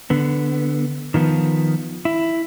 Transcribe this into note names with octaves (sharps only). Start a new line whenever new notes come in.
D3 B3
D#3 F3 B3
E4